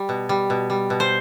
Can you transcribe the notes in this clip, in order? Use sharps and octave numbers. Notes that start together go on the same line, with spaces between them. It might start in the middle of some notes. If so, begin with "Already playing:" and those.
Already playing: G3
B2
G3
B2
G3
B2
C5